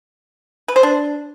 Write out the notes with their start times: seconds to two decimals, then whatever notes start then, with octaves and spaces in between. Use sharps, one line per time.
0.68 B4
0.76 C5
0.83 D4